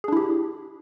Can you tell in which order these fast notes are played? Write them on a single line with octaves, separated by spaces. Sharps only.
G#4 D4 E4 G4